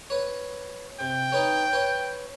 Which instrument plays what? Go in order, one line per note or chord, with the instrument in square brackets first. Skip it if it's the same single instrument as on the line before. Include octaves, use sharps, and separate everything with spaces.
[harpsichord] B4 C#5
[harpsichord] C3 [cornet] G5
[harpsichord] D#4 B4 C#5
B4 C#5